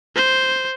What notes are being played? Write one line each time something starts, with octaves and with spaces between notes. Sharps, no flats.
C5